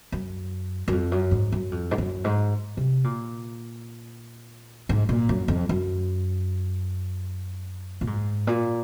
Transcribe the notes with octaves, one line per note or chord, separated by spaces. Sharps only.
F#2
F#2
F2
F#2
G#2
F#2
F2
G#2
F#2
G#2
C3
A#2
G#2
A#2
F#2
F2
F#2
A#2
G#2
A#2